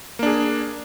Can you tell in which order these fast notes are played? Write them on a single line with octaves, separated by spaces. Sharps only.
A#3 D4 G#4